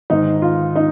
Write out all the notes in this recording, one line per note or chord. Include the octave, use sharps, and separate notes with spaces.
G#2 D#3 D#4
F4
D#4